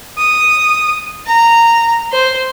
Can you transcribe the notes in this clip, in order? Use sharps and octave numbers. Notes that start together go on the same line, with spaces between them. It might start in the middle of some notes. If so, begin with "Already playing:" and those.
D#6
A#5
C5